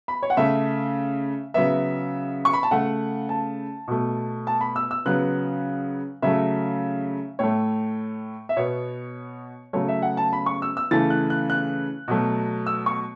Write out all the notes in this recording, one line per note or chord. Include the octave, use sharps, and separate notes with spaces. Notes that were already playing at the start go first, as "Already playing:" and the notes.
B5
C#5
F#5
C#3 A3 E5
C#3 F#3 B3 E5
C#6
B5
A5
C#3 A3 F#5
A5
B2 A3
A5
B5
E6
E6
C#3 F#3 B3 F#6
C#3 F#3 A3 E5
A2 A3 C#5
E5
B2 B3 C#5
C#3 F#3 A3 C#5
E5
F#5
A5
B5
C#6
E6
E6
C#3 E3 A3 A6
F#6
F#6
F#6
B2 F#3 A3
E6
C#6